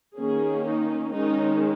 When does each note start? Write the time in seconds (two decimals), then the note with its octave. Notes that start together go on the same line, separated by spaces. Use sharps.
0.18 D#3 A#3 C#4 G#4
0.66 D#4
1.14 D#3 G#3 C#4 D#4